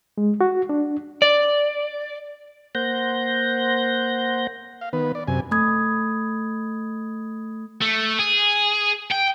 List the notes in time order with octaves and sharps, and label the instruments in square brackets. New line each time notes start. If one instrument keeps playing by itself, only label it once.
[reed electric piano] G#3
F#4
D4
[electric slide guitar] D5
[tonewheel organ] A#3 C5 F#5 G6 A#6
[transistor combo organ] F5
D#3 B3 B4
D5
F#2 C3 G#5
[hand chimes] A3 B5 D#6 G#6
[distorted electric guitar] A3
G#4
G5